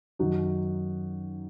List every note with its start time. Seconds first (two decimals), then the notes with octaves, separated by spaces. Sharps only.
0.19 F#2 D#3 D#4 F#4